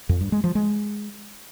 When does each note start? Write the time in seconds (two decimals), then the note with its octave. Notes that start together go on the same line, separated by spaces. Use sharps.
0.09 F2
0.21 G2
0.32 G#3
0.44 F3
0.55 G#3